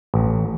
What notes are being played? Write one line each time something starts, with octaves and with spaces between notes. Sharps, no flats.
A1